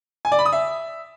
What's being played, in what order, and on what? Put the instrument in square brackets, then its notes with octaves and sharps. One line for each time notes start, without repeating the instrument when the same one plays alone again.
[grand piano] G#5
D5
B5
D#6
E5